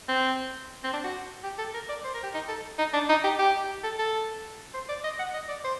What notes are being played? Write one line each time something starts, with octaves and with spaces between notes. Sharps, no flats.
C4
C4
D4
F#4
G4
A4
A#4
D5
C5
A#4
G4
D#4
A4
D#4
D4
D#4
G4
G4
A4
A4
C5
D5
D#5
F#5
D#5
D5
C5